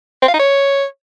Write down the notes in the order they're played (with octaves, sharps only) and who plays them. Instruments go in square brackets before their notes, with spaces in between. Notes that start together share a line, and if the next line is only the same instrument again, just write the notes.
[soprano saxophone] C4
F5
D#4
C#5